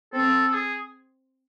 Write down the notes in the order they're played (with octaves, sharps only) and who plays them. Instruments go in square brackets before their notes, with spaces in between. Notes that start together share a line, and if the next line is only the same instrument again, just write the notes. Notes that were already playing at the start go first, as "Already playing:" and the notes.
[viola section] C4 [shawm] A4
[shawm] A4
G#4